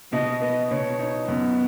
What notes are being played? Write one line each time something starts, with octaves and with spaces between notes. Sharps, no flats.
B2 D#5
B3 D#5
B2 C#5
D#4
F#2 B3